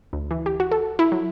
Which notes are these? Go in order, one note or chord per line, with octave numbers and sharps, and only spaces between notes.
D2
E3
G4
F#4
A4
E4
F#3